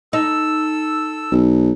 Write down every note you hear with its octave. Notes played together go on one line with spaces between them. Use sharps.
D#4 A4 E6
B1